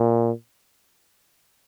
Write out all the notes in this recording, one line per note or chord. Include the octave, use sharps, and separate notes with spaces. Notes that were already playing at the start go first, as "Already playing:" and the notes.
Already playing: A#2